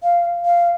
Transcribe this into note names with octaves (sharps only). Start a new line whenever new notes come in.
F5
F5